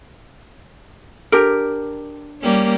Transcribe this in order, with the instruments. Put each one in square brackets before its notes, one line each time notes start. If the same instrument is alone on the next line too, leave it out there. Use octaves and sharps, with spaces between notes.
[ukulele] D4 G4 A#4
[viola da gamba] G3 A#3 C#4